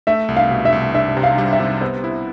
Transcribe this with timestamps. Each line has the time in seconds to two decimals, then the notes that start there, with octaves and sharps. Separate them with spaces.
0.07 A3 E5
0.28 C2
0.37 F5
0.51 B2
0.65 E5
0.72 C2
0.94 D4 E5
1.17 C3
1.23 F5
1.38 G3
1.52 E5
1.60 C3
1.81 B3 C5
2.04 E4